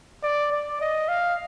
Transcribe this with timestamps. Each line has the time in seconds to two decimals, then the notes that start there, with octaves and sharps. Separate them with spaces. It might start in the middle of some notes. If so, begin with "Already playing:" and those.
0.23 D5
0.51 D5
0.81 D#5
1.08 F5